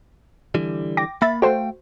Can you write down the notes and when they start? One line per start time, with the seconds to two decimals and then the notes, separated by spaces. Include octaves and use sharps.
0.55 D3 E3 G3
0.97 G5 D6 A#6
1.22 A#3 E5 B5 A6
1.42 A3 F#4 A4 C5 F5 G5